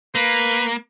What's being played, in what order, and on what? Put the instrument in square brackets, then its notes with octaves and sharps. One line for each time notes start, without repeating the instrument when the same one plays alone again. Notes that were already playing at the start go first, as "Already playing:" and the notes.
[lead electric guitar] A#3 [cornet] B4